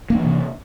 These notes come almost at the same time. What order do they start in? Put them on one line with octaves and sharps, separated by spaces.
A#3 D4 E3 C3